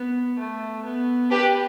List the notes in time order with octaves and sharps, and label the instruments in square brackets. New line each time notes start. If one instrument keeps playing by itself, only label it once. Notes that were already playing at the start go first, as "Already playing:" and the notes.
Already playing: [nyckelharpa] B3
A3
B3
[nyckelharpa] D4 [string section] G4 B4